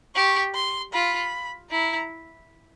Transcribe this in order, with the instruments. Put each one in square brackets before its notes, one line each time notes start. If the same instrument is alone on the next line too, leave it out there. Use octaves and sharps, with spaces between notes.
[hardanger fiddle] G4 [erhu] C#6
[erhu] C6
[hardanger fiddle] F4 [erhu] B5
[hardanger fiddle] E4 [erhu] A#5